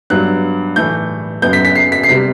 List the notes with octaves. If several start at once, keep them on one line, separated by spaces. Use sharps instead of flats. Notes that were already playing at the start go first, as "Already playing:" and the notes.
G2 F#3 B3 F#6
A2 E3 A3 G6
F#2 F#3 B3 G6
B6
B6
C7
B6
C7
C3 G3 B3 B6